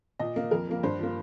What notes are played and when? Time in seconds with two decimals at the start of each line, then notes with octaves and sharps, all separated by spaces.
0.19 A#2 D#5
0.36 A#3
0.51 F2 A#4
0.67 F3 A#3
0.83 G2 C5
0.99 F3 A#3